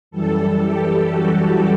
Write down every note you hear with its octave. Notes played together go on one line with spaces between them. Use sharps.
F#2 E3 G3 A4
G4
F#4